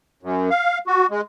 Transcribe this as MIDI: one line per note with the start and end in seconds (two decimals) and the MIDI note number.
0.23 0.49 42
0.50 0.78 77
0.87 1.06 66
1.11 1.21 56